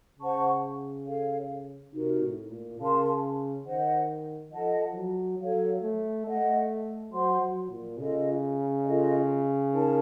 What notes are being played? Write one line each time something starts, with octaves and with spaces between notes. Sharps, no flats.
C#3 C5 F#5 A5 C#6
A4 C#5 F5
C3 D#4 F#4 A#4
A2
A#2
C#3 A#4 F5 A5 C6
D#3 C5 D#5 F#5
F3 A4 D#5 F#5 A5
F#3
F#3 A4 C#5 F5
A3
A3 A4 D#5 F#5
F#3 C5 F#5 C6
F#3
A#2
C#3 F4 A4 D#5
F4 A4 D#5
D#4 A#4 C#5 A5